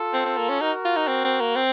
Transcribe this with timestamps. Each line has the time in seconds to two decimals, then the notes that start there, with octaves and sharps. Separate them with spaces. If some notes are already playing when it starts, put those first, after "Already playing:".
Already playing: F4 A4
0.13 C4
0.26 C4
0.37 A#3
0.49 C#4
0.61 D#4 F#4 A#4
0.85 F4
0.96 D#4
1.08 C4
1.25 C4
1.40 A#3
1.56 C4